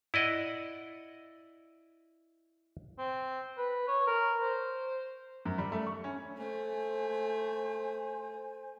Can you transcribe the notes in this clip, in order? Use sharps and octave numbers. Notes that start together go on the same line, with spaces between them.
E4 D5 D#5 F#5
C4
B4
C#5
A#4
C5
F#2
G3
A3
C#6
C#4
A3 C5 G#5